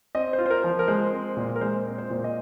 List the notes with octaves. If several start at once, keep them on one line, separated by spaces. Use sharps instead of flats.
C4 D#5
C5
F4
C5
A#4
F3
C5
A#4
G#3 C5
C4
A#2
A#4
G#3 C5
C4
C5
A#2
D#5